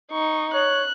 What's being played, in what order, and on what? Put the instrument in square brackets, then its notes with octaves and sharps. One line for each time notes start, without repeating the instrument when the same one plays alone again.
[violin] D#4 C#6
[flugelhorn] C#5 [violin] F#6